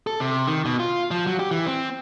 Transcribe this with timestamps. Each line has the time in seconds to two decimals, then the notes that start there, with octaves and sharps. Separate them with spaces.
0.07 A4
0.20 C3
0.47 D#3
0.65 B2
0.80 F4
1.11 F3
1.27 F#3
1.39 G4
1.51 E3
1.66 C4